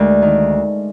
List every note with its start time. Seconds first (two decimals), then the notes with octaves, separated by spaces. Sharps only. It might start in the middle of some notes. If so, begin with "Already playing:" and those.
Already playing: D2 G#3 A#4
0.22 D#3